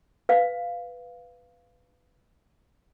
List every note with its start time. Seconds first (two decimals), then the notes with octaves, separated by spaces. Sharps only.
0.29 B4 F5